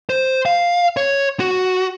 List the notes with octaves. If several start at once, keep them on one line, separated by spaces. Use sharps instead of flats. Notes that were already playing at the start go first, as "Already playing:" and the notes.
C5
F5
C#5
F#4